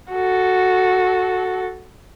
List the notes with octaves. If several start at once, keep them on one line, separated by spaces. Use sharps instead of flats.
F#4 A4